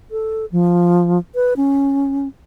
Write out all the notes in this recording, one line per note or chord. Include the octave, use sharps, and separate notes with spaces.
A4
F3
B4
C#4